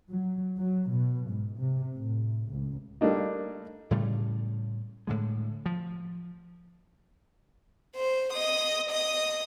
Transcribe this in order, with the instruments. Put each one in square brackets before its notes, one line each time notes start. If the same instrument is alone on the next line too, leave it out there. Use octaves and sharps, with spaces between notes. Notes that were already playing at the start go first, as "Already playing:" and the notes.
[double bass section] F#3
F#3
B2
G#2
C3
A2
C#2
[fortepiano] G3 A3 A#3 D4 D#4
[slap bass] A2 C#3 G3 A3
A2 D3 G#3
F3
[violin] C5
D#5 D#6
D#5 D#6